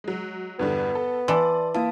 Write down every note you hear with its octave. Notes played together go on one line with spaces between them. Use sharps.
F#3 G#3
E2 G2 D3 B3
A4
E3 D5 A5 C6
A#3 E4 F5 A5